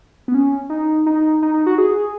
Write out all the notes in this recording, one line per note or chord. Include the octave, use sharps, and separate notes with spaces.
B3
C#4
D#4
D#4
D#4
D#4
F#4
G#4